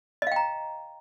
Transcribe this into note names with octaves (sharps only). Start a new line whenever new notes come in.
D#5 F5 G5 A#5